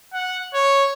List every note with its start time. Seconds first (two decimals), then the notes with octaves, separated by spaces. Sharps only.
0.13 F#5
0.54 C#5